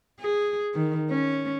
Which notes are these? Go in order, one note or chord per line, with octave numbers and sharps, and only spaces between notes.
G#4
D#3
C#4